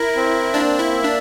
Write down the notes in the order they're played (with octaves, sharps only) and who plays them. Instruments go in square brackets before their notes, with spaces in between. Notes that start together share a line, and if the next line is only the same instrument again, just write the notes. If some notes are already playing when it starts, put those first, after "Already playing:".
Already playing: [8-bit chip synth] E4 [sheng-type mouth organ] A#4
[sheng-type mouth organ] C4
[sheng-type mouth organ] A#3 [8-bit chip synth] D4
[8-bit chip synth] E4
[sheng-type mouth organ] E5
[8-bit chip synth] D4